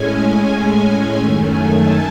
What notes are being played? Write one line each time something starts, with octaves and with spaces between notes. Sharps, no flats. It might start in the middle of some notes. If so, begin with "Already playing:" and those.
Already playing: A2 G#3 C#4 G#5
F#2 D#3 A3 G#5
G#5
A5